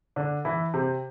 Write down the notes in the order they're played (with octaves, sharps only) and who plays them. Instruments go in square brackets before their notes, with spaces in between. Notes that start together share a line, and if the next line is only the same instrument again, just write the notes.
[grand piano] D3 D4
E3 E4
C3 C4